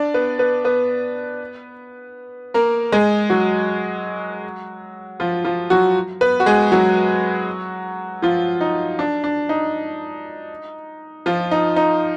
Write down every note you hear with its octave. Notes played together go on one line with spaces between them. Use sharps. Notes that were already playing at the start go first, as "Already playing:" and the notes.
Already playing: D4 D5
B3 B4
B3 B4
B3 B4
A#3 A#4
G#3 G#4
F#3 F#4
F3 F4
F3 F4
F#3 F#4
B3 B4
F#4
G#3 G#4
F#3 F#4
F3 F4
D#4
D4
D4
D#4
F3 F4
D#4
D#4